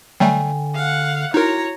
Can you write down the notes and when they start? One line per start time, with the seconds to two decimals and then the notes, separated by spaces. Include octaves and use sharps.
0.20 D3 F#3 G3 A3 G5 G#5
0.75 F5 F#5
1.34 D#4 E4 F#4 A#4 C#5 A#5